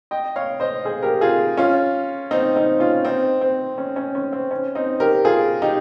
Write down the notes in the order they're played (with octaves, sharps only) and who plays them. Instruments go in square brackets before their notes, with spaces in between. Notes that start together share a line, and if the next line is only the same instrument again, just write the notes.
[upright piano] D#5 G5
C#5 F5
C5 D#5
G#4 C5
G4 A#4
F4 G#4
C#4 F4
C4 D#4
C4 D#4
C#4 F4
C4 D#4
C4
C#4
C#4
C#4
C4
C#4
C4 D#4
G4 A#4
F4 G#4
D#4 G4